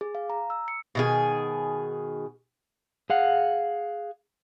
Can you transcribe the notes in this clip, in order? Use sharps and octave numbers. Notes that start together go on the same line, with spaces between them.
G#4
F5
A#5
E6
C#7
B2 D#3 G#4
G#4 F5 F#5